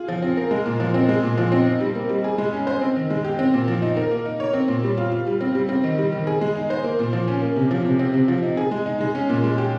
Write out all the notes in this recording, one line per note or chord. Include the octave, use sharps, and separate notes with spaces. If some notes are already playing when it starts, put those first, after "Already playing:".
Already playing: F4 G#4
F3
C4
A#4
G#3
A#2
F3
C4
G#3
A#2
F3
C4
D#4
G3
A#3
G3
G#4
G#3
C#4
C5
C4
D#3
G#3
G4
C4
A#2
F3
D#4
A#4
A#3
D#4
C#5
C4
A#2
G3
F4
F4
G3
C4
G3
C4
D#3
G3
D#3
G#4
G#3
D#4
C5
A#3
A#2
F3
C#4
A#3
C3
F3
C3
C4
C3
F3
D#4
G#4
G#3
D#4
G#3
C#4
A#2
G#3
G4